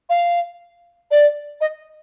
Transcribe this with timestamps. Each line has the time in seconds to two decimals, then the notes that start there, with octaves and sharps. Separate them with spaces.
0.09 F5
1.11 D5
1.61 D#5